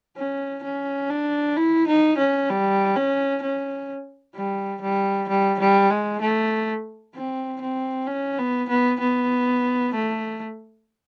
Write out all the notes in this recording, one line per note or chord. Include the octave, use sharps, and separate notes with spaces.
C#4
C#4
D4
E4
D#4
C#4
G3
C#4
C#4
G3
G3
G3
G3
G#3
A3
C4
C4
C#4
B3
B3
B3
A3